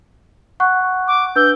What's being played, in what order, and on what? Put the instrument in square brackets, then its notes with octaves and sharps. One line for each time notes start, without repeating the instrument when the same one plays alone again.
[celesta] F#5 C#6 F#6
[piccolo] D6
[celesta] D4 B4 E6 [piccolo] G6